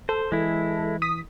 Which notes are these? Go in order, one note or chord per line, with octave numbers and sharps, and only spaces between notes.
A4 C5
E3 G#3 E4
D#6 B6